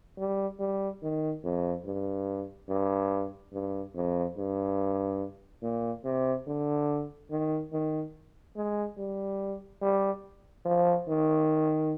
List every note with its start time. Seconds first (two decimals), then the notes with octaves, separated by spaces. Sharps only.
0.18 G3
0.60 G3
1.02 D#3
1.44 F2
1.85 G2
2.69 G2
3.53 G2
3.95 F2
4.37 G2
5.63 A#2
6.04 C3
6.47 D3
7.30 D#3
7.72 D#3
8.56 G#3
8.98 G3
9.82 G3
10.65 F3
11.08 D#3